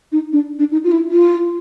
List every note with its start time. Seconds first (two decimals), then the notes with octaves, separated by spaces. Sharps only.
0.12 D#4
0.33 D4
0.59 D4
0.71 D#4
0.84 F4
0.92 E4
1.11 F4